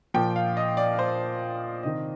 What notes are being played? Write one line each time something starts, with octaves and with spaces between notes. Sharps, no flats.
A#2 F3 G5
F5
D#5
D5
C5
C3 D#3 D#5